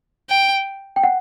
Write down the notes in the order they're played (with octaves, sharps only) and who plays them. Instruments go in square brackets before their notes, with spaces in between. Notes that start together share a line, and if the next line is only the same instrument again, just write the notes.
[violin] G5
[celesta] G5
F#5